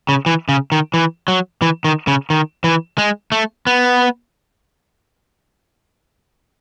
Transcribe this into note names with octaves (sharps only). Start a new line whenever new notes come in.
C#3
E3
C#3
D#3
E3
F#3
E3
D#3
C#3
D#3
E3
G#3
A3
B3